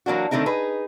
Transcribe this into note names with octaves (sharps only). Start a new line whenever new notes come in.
E3 F#3 A#3 D4 F#4
D3 D#3 A3 C4 D#4
D#4 G#4 B4